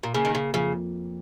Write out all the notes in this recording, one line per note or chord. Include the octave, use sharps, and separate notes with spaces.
A#2
C#3 A#3
D#3
C#3
F2 C#3